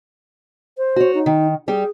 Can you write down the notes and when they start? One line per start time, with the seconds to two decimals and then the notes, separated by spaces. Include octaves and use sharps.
0.78 C5
0.96 F#4 C#5
1.14 D#4
1.26 D#3
1.68 G3 G4 G#4